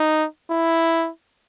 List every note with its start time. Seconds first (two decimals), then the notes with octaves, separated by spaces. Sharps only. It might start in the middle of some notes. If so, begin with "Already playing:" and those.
Already playing: D#4
0.51 E4